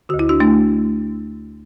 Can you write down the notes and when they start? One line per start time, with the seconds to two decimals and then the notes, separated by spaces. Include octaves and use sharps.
0.09 D2 D3 F#4
0.19 E4
0.29 D4 F#4
0.40 A3 D4